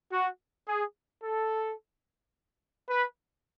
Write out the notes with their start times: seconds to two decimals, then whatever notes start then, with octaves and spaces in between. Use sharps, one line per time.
0.10 F#4
0.67 G#4
1.22 A4
2.89 B4